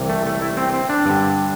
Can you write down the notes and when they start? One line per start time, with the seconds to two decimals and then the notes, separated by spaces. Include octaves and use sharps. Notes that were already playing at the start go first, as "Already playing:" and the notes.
Already playing: C2 C3 E3
0.09 A3
0.26 A3
0.42 E4
0.57 C4
0.74 C4
0.89 D4
1.06 G2 D3